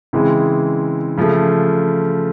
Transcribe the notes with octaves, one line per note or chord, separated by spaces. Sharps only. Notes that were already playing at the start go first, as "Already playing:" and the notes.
C#3 E3 G#3 C4
C#3 F3 A3